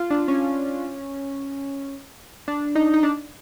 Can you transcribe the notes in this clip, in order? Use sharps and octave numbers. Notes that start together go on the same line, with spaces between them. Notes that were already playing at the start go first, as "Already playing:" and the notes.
Already playing: F4
D4
C#4
D4
D#4
D#4
D4